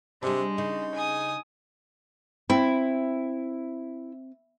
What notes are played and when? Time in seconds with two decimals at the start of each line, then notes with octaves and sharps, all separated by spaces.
0.23 C3 G3 G#3 D4
0.58 C#3 D#4
0.94 G#5 D#6
2.50 C4 E4